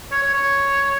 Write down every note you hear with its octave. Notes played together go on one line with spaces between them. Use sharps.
C#5
C#5
C#5